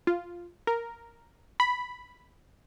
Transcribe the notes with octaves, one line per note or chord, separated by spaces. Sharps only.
F4
A#4
B5